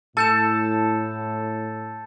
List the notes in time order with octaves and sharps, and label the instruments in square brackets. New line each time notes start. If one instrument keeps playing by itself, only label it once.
[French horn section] A2 [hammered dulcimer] A4 [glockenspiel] A5 G6 E7